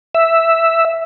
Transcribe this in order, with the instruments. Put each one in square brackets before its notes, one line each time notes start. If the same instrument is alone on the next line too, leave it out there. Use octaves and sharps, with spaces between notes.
[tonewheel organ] E5